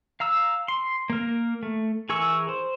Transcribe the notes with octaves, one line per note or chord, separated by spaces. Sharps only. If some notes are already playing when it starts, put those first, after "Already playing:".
F5 A#5 E6
C6
A#3 A#4
A3
E3 G#4 A#4 C#6 E6
C5